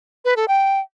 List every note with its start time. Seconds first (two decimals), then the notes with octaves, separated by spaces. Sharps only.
0.25 B4
0.37 A4
0.48 G5